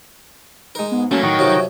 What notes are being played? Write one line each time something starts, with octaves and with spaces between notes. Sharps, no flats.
G#3 D#4 A#4
G#2 B3
F#3 A3 A#3 C#4 A5
A2 D#3 F#4 D#5 G5
F#2 C3 F3 C#5